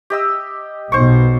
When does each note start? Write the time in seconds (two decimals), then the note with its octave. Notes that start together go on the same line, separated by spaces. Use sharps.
0.10 G4 D#5 E6
0.92 B1 B2 C5 C#6